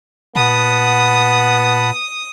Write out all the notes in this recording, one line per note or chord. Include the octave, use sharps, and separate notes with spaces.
A#2 B3 F#5 A5 B5 D#6